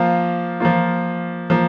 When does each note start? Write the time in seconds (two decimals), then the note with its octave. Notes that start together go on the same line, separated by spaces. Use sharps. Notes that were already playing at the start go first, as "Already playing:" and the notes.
Already playing: F3 A#3 F4
0.60 F3 A#3 F4
1.50 F3 A#3